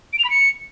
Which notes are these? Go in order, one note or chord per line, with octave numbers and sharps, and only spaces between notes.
D7
F7
B5
C#7